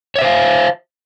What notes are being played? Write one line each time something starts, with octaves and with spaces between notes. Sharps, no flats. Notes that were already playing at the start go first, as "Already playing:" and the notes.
C5 C#5 E5 F5